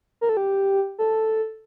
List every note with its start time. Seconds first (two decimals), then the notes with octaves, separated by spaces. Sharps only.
0.21 A#4
0.29 A4
0.37 G4
0.99 A4